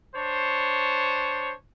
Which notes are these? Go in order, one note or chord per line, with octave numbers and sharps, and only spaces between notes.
D4 C5 C#5